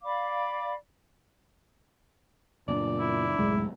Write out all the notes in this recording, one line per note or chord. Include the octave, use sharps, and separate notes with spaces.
D5 F5 B5 D6
F#1 A#2 C#4 D4 D5
E4
C2 F#2 A2 G#3